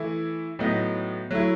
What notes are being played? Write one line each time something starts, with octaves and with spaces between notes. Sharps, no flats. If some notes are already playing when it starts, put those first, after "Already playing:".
Already playing: E3 A3 E4
A2 F#3 B3 D#4
F#3 A3 E4